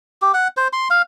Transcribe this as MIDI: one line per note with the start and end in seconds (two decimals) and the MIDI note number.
0.22 0.32 67
0.34 0.48 78
0.57 0.68 72
0.73 0.88 84
0.90 1.02 77